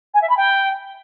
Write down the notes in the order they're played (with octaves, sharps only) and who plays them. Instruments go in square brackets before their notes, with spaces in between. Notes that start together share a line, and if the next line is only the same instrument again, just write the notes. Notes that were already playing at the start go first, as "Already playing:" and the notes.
[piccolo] G#5
E5
B5
G5